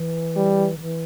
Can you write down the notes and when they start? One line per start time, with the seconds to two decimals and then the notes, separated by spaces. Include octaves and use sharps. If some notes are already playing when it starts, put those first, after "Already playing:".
Already playing: E3
0.36 G3
0.77 D3
0.82 E3